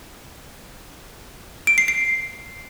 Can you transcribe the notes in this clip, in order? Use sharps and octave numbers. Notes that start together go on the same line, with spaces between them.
D7
C7
C7